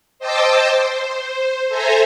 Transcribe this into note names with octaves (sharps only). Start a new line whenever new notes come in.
C5 D#5 G5 A5 D6 E6
C5
A4 C5 E5 G#5 A#5